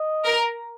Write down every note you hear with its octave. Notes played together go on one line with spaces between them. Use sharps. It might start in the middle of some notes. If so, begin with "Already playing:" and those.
Already playing: D#5
A#4